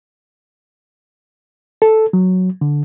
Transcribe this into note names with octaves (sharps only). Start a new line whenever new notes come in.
A4
F#3
D3